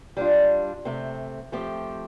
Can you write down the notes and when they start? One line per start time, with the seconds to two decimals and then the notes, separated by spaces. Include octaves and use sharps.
0.17 G3 D4 F4
0.85 C3 A3 C4
1.52 F3 A3 C4 G4